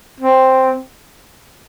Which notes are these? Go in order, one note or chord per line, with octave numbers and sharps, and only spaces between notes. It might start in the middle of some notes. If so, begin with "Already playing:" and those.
C4